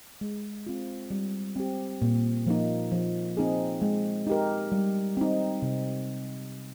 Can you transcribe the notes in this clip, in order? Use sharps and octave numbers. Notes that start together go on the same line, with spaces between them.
G#3
C4 F4
G3
C4 G4
A#2
F3 A#3 D#4
F3
C4 D#4 G#4
G#3
D#4 G4 A#4
G3
C4 D#4
C3